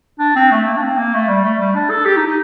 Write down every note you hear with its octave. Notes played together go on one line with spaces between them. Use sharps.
D4
C4
A3
A#3
D4
C4
A#3
A3
G3
A3
G3
D4
A4
G4
D#4
D#4